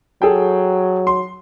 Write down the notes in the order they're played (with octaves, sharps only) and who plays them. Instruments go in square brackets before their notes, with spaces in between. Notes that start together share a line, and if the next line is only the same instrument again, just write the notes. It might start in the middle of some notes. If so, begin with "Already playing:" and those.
[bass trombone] F#3 [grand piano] G#4 A4 G5
[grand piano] C6